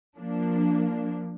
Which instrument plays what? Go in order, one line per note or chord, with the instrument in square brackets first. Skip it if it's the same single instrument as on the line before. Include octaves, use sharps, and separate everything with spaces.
[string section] F3 A#3 D4